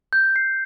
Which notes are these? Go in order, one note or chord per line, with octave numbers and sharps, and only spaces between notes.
G6
C7